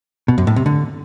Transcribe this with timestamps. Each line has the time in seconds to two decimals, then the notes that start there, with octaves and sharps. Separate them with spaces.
0.28 B2
0.38 F#2
0.47 A2
0.56 C3
0.66 D3